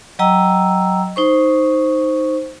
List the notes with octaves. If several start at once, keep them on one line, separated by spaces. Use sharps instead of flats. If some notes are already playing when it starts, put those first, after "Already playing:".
F#3 D#5 G5 A#5 E6
D#4 C5 C#6